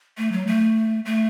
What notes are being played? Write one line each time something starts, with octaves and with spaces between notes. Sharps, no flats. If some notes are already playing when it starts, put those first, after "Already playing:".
A3
F#3
A3
A3